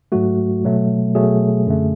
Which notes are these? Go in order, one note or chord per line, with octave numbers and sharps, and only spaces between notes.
G#2 F#3 A3 F#4
B2 F#3 A3
B2 F#3 A3 G#4
F#2 D3 A3